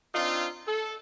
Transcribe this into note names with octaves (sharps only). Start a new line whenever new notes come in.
C4 D4 D#4 F4
A4